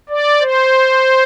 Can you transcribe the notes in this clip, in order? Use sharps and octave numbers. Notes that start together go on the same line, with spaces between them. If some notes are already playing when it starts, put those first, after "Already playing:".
D5
C5